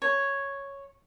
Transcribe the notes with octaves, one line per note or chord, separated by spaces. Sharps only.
C#5